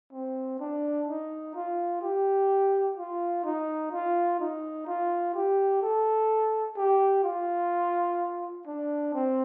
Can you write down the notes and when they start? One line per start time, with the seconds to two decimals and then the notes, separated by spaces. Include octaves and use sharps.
0.13 C4
0.60 D4
1.08 D#4
1.56 F4
2.02 G4
2.97 F4
3.45 D#4
3.92 F4
4.40 D#4
4.87 F4
5.35 G4
5.82 A4
6.77 G4
7.24 F4
8.67 D4
9.14 C4